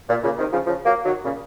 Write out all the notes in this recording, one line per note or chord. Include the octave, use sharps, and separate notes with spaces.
A#2
A#2 C#3
C3 D#3
C#3 F3
C#3 F3
F#3 A#3
D#3 F#3
A#2 C#3